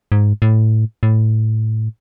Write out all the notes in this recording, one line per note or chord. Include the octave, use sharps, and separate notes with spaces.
G#2
A2
A2